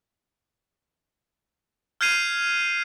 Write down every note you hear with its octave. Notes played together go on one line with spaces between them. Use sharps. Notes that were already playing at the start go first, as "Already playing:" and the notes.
F6 G6 G#6 C7 D#7 F7